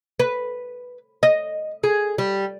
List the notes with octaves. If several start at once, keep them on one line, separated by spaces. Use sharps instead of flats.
B4
D#5
G#4
G3